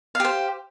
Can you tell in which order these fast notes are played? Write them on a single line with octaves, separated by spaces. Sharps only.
F5 G4 C5